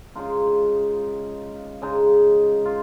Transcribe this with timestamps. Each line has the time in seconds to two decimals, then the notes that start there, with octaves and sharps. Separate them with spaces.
0.15 C#3 G#3 D#4 F4
1.82 C#3 G#3 D#4
2.65 F4